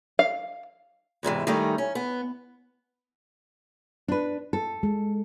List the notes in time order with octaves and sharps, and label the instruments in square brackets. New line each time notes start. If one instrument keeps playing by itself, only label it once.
[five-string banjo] F5
[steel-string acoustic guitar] E2 G#2 C3 E3
D#3 G3 A3 C#4 D#4
C#4
B3
[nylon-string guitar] D4 B4
A4
[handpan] G#3